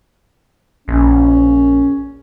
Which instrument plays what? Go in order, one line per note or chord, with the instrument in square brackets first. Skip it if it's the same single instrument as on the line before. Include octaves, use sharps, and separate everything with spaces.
[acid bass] A#1 [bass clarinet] C#4